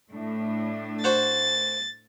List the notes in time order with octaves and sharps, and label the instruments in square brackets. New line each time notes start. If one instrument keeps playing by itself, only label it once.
[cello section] A2 A3 D4
[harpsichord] F#4 C5 F#5 [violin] A6